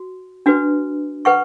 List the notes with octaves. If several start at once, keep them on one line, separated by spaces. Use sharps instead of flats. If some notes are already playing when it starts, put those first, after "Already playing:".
Already playing: F#4
D4 F#4 B4
B4 F#5 C#6